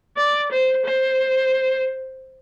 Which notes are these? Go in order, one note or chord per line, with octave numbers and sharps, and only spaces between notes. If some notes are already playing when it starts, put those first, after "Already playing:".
D5
C5
C5